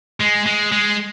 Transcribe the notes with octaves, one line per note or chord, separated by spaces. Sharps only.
G#3
G#3
G#3